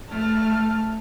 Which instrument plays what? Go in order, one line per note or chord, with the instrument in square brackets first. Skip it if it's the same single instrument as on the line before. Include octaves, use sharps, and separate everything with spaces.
[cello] A3 [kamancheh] A5 F6